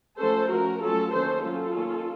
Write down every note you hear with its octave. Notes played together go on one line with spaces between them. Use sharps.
F3 A3 C#4 A4 C5
F3 A3 C#4 F#4 A#4
F#3 A3 C#4 F4 A4
D#3 A#3 C#4 A4 C5
F#3 A#3 C#4 F4 A4
D#3 A#3 C#4